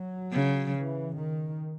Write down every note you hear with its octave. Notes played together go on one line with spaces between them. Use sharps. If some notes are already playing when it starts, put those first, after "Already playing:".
Already playing: F#3
C#3
E3
D#3